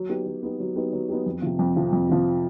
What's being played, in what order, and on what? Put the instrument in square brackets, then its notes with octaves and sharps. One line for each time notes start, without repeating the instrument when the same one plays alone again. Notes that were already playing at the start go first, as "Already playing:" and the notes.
Already playing: [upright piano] F#3
B3 D#4 G4
F#3
B3 D#4 G4
F#3
B3 D#4 G4
F#3
B3 D#4 G4
F2
C3 F3
F2
C3 F3
F2
C3 F3